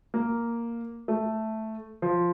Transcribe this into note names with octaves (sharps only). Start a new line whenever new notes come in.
A#3
A3
F3